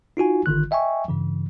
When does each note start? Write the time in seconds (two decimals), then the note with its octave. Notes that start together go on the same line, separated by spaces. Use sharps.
0.17 D#4 F4 F#4 G#5
0.46 G1 D3 D#3 F#6
0.71 D#5 E5 G5 G#5 C#6
1.08 G2 C#3 E3